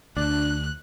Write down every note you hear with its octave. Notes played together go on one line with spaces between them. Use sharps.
D2 D4 F#6